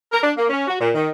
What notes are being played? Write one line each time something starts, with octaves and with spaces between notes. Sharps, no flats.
A#4
D4
A#3
C#4
F#4
A#2
D#3